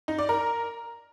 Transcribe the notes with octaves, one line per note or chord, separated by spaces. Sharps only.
D#4
D5
A#4